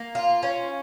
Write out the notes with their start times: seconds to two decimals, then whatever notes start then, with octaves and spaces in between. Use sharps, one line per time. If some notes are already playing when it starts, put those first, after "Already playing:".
Already playing: A#3
0.15 F4
0.43 C#4